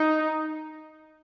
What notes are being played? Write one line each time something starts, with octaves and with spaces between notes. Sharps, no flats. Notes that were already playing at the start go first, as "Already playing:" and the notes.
Already playing: D#4